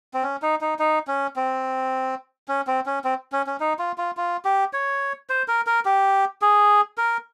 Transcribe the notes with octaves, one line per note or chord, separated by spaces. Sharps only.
C4
C#4
D#4
D#4
D#4
C#4
C4
C#4
C4
C#4
C4
C#4
C#4
D#4
F4
F4
F4
G4
C#5
C5
A#4
A#4
G4
G#4
A#4